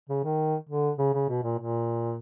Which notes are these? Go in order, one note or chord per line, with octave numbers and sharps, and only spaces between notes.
C#3
D#3
D3
C#3
C#3
B2
A#2
A#2